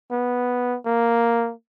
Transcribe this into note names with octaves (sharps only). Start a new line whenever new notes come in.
B3
A#3